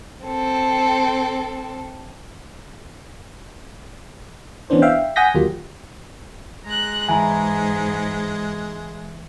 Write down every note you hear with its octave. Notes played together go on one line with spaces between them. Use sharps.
C4 A4
E3 B3 C#4 D4 C5
E5 F5 G5
F#5 G#5 D#6 G6 A#6 B6
D#2 F#3 A#3 F4 G4
G#3 A#5 F#6
G#2 E3 G#5 A#5